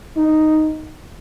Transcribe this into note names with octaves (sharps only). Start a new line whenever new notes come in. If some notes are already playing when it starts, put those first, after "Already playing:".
D#4